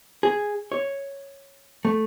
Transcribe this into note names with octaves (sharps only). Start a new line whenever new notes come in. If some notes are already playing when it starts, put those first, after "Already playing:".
G#4
C#5
A3